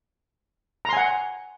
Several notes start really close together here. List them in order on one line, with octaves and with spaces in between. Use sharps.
A#5 C6 G#5 F#5